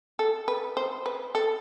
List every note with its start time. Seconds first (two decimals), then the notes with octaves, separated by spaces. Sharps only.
0.19 A4
0.48 B4
0.77 C5
1.06 B4
1.35 A4